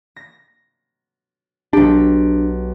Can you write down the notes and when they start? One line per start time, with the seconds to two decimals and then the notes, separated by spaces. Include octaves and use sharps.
0.16 A#6
1.73 B1 D4 G4